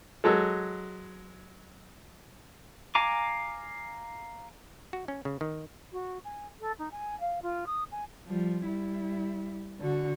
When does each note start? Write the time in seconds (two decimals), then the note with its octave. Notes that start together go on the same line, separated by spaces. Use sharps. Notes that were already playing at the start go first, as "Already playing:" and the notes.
0.24 F#3 G#3 A4
2.95 F5 G#5 A#5 D6
4.93 F#4
5.08 C#4
5.25 C#3
5.41 D#3
5.92 F#4
6.24 G#5
6.60 A4
6.79 D#4
6.91 G#5
7.20 F5
7.42 F4
7.66 D#6
7.92 G#5
8.27 F3 G3
8.64 G3 E4
9.80 D3 F#4